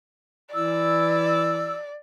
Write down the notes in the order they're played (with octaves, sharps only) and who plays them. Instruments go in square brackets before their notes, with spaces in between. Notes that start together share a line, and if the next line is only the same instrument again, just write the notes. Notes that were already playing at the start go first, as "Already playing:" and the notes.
[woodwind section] E3 E4 E6 [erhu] D5